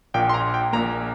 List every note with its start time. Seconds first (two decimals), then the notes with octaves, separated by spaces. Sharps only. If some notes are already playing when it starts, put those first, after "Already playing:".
0.14 A#1 A#2 A#3 G5
0.29 C6
0.34 A#5
0.54 G5
0.73 A#1 A#2 A#3 A#5